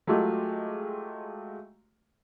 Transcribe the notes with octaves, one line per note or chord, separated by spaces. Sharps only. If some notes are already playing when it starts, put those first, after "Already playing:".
F#3 G#3 A3 F4 G4